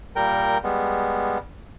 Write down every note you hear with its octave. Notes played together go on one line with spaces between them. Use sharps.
A#2 G3 A#4 G5
G3 G#3 B3